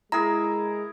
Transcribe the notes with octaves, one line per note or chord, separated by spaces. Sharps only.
G#3 E4 G#4 A#4 A#5